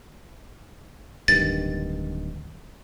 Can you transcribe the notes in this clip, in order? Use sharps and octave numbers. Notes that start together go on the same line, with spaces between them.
D1 G2 D#3 A6